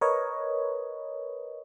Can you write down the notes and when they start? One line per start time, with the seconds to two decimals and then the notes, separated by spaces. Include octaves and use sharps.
0.01 A#4 B4 C#5 D#5